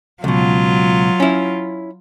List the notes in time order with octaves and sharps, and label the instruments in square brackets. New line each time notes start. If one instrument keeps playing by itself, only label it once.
[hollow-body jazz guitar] C#2 B2 [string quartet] F#3 F4
[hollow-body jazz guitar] C#4 E4